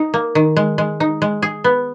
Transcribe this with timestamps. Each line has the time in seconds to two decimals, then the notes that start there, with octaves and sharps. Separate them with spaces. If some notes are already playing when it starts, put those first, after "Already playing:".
Already playing: D#4
0.14 A#3
0.35 D#3
0.57 G#3
0.78 G#3
1.00 D#4
1.22 G#3
1.42 G#4
1.64 B3